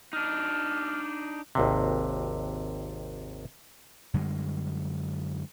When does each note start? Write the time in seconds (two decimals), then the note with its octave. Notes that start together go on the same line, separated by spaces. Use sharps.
0.13 D4 D#4 F6
1.55 G#1 D#2 C3
4.14 F#2 D3 G3 G#3